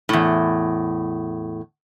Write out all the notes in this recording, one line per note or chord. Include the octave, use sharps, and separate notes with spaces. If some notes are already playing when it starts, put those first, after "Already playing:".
E2 A2